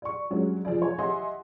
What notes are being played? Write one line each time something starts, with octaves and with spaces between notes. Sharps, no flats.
D5 C#6
G2 F#3 G#3 C#4
F1 F3 G#4 D5
F3 C#5 G#5
G4 D#5 E5 F#5 G#5 C6